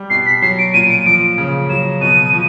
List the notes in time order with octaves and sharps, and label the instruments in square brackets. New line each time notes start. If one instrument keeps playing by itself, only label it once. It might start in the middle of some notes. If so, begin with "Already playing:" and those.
Already playing: [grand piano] G3
[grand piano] B2 [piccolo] C7
[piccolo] B6
[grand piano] F#3 [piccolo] C7
[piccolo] D7
[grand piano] A#2 [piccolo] D#7
[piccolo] D7
[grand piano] F3 [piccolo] D7
[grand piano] C#3
[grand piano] F#3 [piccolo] E7
[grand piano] B2 [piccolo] D#7
[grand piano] F3